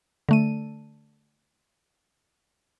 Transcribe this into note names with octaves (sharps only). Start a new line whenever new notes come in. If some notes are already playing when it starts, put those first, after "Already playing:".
D3 A3 D#7